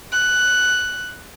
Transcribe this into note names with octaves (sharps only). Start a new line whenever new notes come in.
F#6